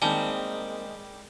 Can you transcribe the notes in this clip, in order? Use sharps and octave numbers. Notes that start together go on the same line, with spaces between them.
D#3 G3 G#3 A#3 C4 G#5 A5